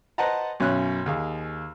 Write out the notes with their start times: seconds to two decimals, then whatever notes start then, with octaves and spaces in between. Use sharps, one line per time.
0.18 B4 C5 D#5 F#5 A5 A#5
0.60 B1 F#2 C#4 F#6
1.06 D#2 G#4 F5